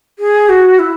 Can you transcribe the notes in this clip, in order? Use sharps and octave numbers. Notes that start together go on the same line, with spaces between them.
G#4
F#4
E4